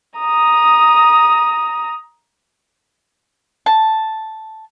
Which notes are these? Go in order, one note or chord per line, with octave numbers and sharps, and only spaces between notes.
A#5 D#6
A5